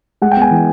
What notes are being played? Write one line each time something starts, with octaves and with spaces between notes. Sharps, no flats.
G#3 F#5
G5
B3 G#5
E3